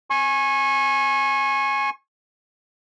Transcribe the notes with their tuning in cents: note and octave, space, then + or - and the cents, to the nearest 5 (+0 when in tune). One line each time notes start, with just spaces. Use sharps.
G#5 +5 C#6 -30